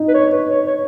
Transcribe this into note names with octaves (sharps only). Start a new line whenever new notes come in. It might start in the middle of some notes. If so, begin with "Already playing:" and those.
Already playing: D#4
B4
C#5
B4
C#5
C#5